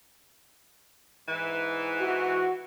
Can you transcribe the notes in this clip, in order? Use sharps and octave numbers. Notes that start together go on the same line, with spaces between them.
G#2 E3
F#4